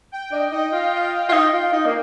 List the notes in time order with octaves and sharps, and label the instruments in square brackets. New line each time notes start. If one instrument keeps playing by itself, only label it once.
[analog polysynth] G5
[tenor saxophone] D4 [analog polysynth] D#5
[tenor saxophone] D#4 [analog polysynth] D#5
[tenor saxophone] F4 [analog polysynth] F5
[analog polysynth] D#5
F5
[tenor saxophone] F4
[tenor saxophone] D#4 [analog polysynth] G5
[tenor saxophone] F4
D#4
A#3